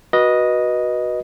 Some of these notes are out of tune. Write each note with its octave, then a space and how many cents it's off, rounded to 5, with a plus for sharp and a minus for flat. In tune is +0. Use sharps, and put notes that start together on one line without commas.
F#4 +0 B4 -25 D#5 +0